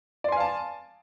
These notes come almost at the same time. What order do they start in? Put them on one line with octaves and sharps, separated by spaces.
D5 C6 G#5 F5 A5